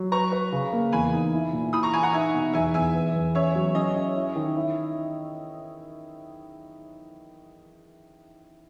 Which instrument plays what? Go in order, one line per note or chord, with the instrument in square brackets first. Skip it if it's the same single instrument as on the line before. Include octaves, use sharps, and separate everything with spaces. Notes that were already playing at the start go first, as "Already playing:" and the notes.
Already playing: [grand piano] F#3
[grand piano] B4 [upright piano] A#5 C#6
[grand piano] B4
C#3
A#3
[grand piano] E2 [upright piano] G#5 B5
[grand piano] D#4
E4
A#2
[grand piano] E3 [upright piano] B5 D#6
[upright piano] A#5 C#6
[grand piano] E3 [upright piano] G#5 B5
[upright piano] F#5 A#5
[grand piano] D#4 [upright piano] E5 G#5
[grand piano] B2
[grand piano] E2 [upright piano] E5 G#5
[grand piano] E2 [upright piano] E5 G#5
[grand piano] B3
E2
[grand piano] C#4 [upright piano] C#5 E5
[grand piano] F#3
[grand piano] C#4 [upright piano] D#5
[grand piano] C#4
E4
D#3
E4